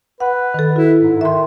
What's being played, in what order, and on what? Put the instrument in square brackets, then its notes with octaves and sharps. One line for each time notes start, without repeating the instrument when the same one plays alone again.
[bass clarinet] B4 [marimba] F#5
[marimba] D#3 A4
[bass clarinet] E4 [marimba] F#4
[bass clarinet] G#2
[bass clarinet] D#3 [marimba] E5 C6